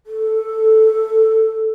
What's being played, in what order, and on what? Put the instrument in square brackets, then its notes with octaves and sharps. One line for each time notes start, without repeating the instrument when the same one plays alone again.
[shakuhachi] A4